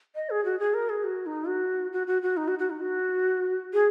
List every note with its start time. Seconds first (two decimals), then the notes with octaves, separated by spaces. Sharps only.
0.15 D#5
0.30 G#4
0.45 F#4
0.59 G#4
0.74 A#4
0.89 G#4
1.04 F#4
1.26 D#4
1.47 F#4
1.92 F#4
2.07 F#4
2.22 F#4
2.37 D#4
2.48 F#4
2.59 F#4
2.70 D#4
2.81 F#4
3.73 G#4